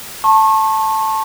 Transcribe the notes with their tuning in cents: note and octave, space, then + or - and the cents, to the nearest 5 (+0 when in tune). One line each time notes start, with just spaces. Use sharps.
A5 +0 C#6 -35